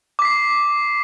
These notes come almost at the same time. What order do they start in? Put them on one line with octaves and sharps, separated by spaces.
D6 B6 C7